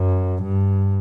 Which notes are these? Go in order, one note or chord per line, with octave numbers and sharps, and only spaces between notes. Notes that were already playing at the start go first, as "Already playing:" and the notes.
Already playing: F#2
G2